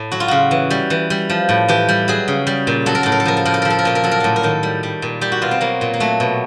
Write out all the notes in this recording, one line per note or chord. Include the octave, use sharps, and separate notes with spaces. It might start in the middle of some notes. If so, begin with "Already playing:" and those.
Already playing: A2
F#3 F#4
F4
C#3 F#4
E3
G3
E3
G3
F3
A2
E3 G4
G3
F#3 G#4
C#3
G3
A#2
F#3 A4
A#4
A2 A4
A#4
A4
F3 A#4
A4
A2 A#4
A4
F3 A#4
A4
A#4
A#2 A4
A#4
F#3 A4
A#4
A2 A4
A#4
D#3 A4
G3
G3
A#2
G3 G4
F#4
B2 F4
C4
F#3 A#3
A#2
A#3
F#3 A3
B2